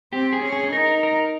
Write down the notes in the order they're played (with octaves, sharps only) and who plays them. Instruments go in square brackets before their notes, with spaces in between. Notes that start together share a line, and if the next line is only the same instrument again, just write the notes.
[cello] C4 [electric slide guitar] G4
[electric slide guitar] G#4
[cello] C#4
[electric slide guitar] G#4
[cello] D#4 [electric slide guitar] A#4
[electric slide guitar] A#4